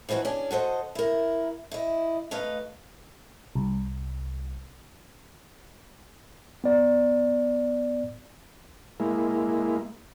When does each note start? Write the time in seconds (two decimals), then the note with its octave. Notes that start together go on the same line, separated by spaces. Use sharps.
0.09 E3 F3 C4 D#4 F#4
0.25 C#4 D4 G#4
0.51 F#4 A4 C5 D#5
0.95 E4 A#4
1.71 E4 D#5
2.31 A3 D#4 B4 D#5 F5
3.55 C2
6.64 B3 D5
9.00 G#3 A#3 E4